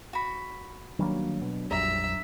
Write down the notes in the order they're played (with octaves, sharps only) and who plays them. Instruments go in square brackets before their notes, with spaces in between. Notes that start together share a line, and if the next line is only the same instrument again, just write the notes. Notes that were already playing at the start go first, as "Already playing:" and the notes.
[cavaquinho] F#4 B5
[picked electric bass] D#3 G3 A#3 [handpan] F#3 D4
[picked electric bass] B2
[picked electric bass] A#1 F2 G3 [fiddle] E5 [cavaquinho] A#5